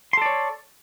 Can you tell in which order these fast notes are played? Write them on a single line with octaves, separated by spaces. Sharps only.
C6 A4 D5 C#5